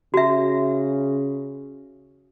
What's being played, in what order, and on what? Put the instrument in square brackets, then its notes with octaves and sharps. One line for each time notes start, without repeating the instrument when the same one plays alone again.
[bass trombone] C#3 [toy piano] F#4 E5